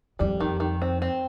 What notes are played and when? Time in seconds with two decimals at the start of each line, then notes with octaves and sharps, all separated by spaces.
0.19 F2 G3
0.40 D#3
0.60 D#3
0.82 C4
1.02 C4